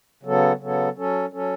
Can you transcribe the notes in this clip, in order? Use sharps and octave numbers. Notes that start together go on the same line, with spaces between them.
C#3 F#3 B3 A4
C#3 F#3 B3 A4
F#3 C#4 A4
F#3 C#4 A4